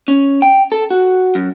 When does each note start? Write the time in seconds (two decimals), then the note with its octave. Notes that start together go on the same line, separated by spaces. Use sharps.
0.08 C#4
0.42 G5
0.72 A4
0.90 F#4
1.35 F#2